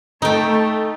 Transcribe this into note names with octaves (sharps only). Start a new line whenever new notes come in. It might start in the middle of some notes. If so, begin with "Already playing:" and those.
A3 D#4 G5